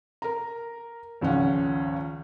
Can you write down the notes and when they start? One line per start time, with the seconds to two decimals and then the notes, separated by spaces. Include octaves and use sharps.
0.22 A#4 A#5
1.21 G#1 C#2 F3 C#4 F#5